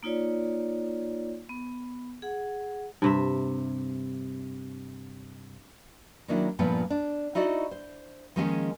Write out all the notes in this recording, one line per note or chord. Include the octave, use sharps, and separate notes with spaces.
A#3 D#4 F4 C#5 D5
B3
G#4 F#5
G2 C3 E5
D#3 F#3 A#3 C#4 D4 E4
G2 A#2 F3 A3 B3 C#4
D4
D#4 E4 F#4 D5 D#5
C5
D#3 F3 G#3 A#3 C#4 G#4